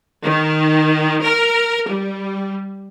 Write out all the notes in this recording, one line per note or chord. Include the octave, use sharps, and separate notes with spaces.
D#3
A#4
G3